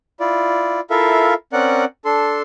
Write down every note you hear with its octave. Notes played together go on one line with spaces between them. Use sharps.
E4 F4 D5
E4 F4 A4 A#4 E5 F5
C4 C#4 A#4 D5 F#5 F#6
D4 A4 C6